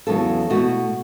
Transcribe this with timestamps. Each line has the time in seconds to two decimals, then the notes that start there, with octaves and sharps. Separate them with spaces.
0.07 E2 C#3 F#3 B3 E4 A4
0.50 B2 A3 E4 F#4